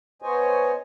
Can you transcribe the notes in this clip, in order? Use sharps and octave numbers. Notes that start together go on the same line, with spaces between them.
B3 C5 C#5 D#5 G#5